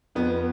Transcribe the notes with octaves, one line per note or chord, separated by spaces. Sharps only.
F2 B3